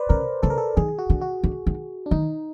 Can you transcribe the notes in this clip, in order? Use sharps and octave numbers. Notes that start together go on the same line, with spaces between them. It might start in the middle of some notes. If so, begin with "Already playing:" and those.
Already playing: B4 C5 D5
C#3 A#4
C#3 A4
A#4
A4
D#3 G#4
F#4
D3
F#4
D3
D#3
D4
D#3 D#4